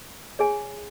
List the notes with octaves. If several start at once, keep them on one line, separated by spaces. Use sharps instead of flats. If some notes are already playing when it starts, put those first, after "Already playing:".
G#4 C#5 G#5